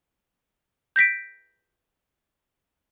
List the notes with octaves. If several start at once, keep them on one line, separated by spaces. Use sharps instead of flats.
G6 A#6 B6 D7